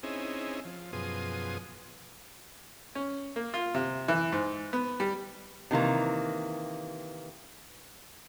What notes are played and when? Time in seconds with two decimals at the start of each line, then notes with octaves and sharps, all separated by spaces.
0.03 C4 C#4 D#4 E4 G#4
0.65 F3
0.93 F#2 B2 F3 G#4 C6 D#6
2.95 C#4
3.36 A#3
3.54 F4
3.74 C3
4.08 E3
4.32 G#2
4.73 B3
5.00 G3
5.71 C3 D#3 E3 A#3